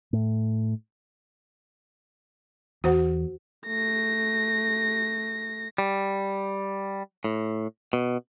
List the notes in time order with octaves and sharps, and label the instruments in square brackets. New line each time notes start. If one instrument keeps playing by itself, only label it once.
[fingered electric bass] A2
[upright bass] E2 [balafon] F#4 C5 F#5
[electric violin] A3 A#6
[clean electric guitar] G3
A2
B2